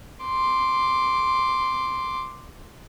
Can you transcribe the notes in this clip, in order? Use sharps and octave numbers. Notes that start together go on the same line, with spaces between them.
C6 D6